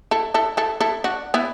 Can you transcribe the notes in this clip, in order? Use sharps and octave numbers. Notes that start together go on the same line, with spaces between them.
E4 A4
E4 A4
E4 A4
E4 A4
D4 F#4
B3 E4